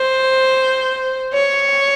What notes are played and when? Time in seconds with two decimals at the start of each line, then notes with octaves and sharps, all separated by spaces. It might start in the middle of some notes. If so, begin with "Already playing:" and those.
Already playing: C5
1.34 C#5